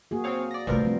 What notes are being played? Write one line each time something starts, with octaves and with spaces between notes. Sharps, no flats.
A#3 F#4 G#4
C4 C#5 F5
D5 A#6
G2 C3 A3 F4 A#4 C5
F3 G3 C4